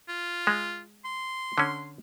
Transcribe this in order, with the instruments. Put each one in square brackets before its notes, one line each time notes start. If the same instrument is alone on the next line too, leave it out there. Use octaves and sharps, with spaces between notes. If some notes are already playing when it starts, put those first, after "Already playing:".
[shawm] F4
[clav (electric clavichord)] G#3
[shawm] C6
[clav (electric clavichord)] D3 C#4